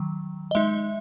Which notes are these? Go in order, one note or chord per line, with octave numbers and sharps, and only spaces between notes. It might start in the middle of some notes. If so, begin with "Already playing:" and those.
Already playing: D#3 F#3
D#5
G#3 D#4 E5